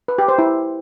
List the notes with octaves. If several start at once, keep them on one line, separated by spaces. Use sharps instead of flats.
B4
G4
C5
E4